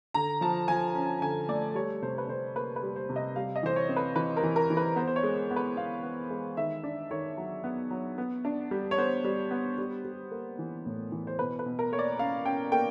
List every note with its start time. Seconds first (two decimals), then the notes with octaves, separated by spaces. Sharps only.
0.14 D3 A#5
0.41 F3 A5
0.68 F3 G#5
0.95 C#4
1.22 D3 G#5
1.49 A3 D5
1.75 G3 C#5
2.02 C3 C5
2.18 B4
2.28 C3 C5
2.56 A#3 B4
2.76 B4
2.83 G3
2.96 C5
3.09 C3
3.16 D#5
3.36 G3 F5
3.56 D#5
3.63 E3 C5
3.76 C#5
3.89 C4
3.97 B4
4.16 E3 B4
4.37 A#4
4.43 E3
4.56 A#4
4.70 E3
4.77 B4
4.96 B3 C5
5.07 C5
5.16 C#5
5.23 G#3
5.51 B3
5.56 B4
5.77 B3 F5
6.03 B3
6.30 G#3
6.57 D#3 E5
6.83 D4 D5
7.11 D#3 C#5
7.37 F#3
7.64 B3
7.91 F#3
8.18 B3
8.45 D4
8.71 G3
8.91 C#5
8.98 B3 C5
9.24 G3
9.51 B3
9.78 G3
10.05 G3
10.31 A#3
10.59 E3
10.86 A2
11.12 E3
11.27 C5
11.39 B2 B4
11.59 B4
11.66 B2
11.79 A#4
11.92 A#3 C#5
11.99 D5
12.19 C#4 F5
12.45 C#4 G5
12.72 A#3 G5